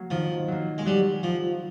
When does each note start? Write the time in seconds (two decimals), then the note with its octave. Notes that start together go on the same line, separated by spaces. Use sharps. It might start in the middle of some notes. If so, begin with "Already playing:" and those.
Already playing: F#3 A#3
0.11 D#3 F3
0.48 F#3 A#3
0.78 G#3
0.86 F#3 G3
1.23 F3